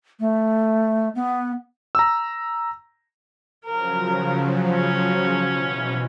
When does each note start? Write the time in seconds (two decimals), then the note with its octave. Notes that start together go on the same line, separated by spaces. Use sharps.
0.20 A3
1.15 B3
1.95 A#5 E6
3.65 C#3 F3 F#3 A#4
4.72 C#4
5.48 B2 E3